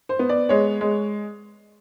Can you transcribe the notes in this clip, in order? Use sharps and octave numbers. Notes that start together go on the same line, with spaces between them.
C5
B3
D5
G#3 C#5
G#3